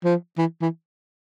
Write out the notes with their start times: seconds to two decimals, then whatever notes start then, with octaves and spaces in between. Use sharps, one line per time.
0.04 F3
0.38 E3
0.61 E3